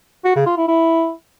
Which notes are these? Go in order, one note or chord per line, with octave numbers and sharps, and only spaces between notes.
F#4
C#3
F4
E4
E4